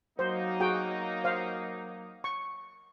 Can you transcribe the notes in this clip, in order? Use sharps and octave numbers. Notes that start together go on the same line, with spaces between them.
F#3 A#3 D#4 C5
F#4 G#4 G5
C5 F5
C#6